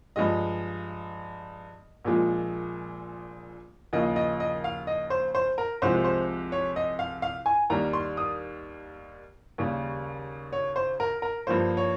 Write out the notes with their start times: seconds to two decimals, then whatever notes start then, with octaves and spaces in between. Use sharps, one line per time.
0.16 G2 F3 G#3 D#5
2.05 A#1 A#2 F3 G#3
3.93 D#2 C#3 F3 A#3 D#5
4.16 D#5
4.40 D#5
4.64 F5
4.87 D#5
5.10 C5
5.35 C5
5.58 A#4
5.82 C2 C3 F3 G#3 C5
6.04 C5
6.52 C#5
6.76 D#5
6.99 F5
7.22 F5
7.46 G#5
7.70 D#2 D#3 G3 A#5
7.93 C6
8.17 D#6
9.58 D#2 C#3 G3
10.53 C#5
10.76 C5
11.00 A#4
11.22 A#4
11.47 G2 F3 A#3 C5
11.77 C#5